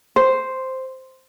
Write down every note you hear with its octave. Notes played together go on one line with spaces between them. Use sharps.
C5